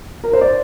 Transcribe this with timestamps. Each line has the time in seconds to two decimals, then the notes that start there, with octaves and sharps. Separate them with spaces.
0.24 A#4
0.33 C5
0.41 D5